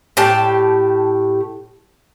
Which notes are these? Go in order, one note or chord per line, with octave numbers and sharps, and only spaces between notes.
A2 G4 A5